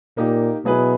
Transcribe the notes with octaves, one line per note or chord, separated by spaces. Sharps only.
A#2 A#3 D#4 G4
B2 F#3 B3 E4 G#4 B4